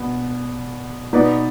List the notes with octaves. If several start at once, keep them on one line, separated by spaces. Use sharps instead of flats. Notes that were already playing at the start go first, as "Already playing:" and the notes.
Already playing: B2 B3 D4
B2 B3 D#4 B4 D5